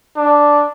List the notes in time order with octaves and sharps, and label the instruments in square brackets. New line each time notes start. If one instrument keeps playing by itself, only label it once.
[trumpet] D4